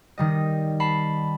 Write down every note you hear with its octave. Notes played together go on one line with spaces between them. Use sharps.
D#3 G3 D#5
A5 B5 C7